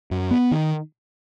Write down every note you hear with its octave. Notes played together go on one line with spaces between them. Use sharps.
F#2
B3
D#3